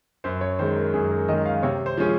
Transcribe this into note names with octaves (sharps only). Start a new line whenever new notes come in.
F#2 C5
C#5
D#3 G#3 C5
A#4
F#2 G#4
A#4
D#3 G#3 D#5
F5
C3 C#5
C5
F3 G#3 C#4